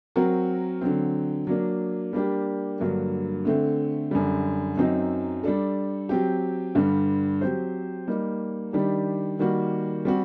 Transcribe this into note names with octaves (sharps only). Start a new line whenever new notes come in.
F#3 C4 F#4 A#4
D3 F#3 C4
F#3 A#3 D4
G3 A#3 D4 G4
G2 D3 F#3 A#3
D3 A3 C4
F#2 D3 G3
F#2 F#3 C4 D#4
G3 D4 A4
F#3 C4 G4
G2 D3 G3
F#3 C4 G4 C5
G3 A#3 D#4
D#3 G3 D4 G4
D#3 G3 A#3 F#4
G3 C4 F#4